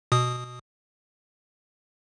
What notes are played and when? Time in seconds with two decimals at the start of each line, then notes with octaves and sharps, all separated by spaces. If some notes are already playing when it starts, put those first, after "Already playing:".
0.12 B2 D#6